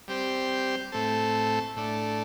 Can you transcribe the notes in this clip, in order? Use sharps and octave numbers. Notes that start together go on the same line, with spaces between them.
G3 C4 G4 C5
A2 A3 C4 A4
A2 A3 D4